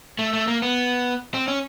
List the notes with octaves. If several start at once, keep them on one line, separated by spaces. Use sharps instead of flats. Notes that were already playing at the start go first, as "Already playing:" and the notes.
A3
A3
A#3
B3
C4
C#4